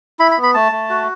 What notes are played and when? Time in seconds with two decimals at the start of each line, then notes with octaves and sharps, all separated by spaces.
0.19 E4 B5
0.31 B5
0.37 B3
0.43 B5
0.54 A3 A5
0.72 A3
0.90 F#4